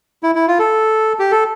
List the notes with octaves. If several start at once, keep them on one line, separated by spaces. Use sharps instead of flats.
E4
E4
F4
A4
G4
A4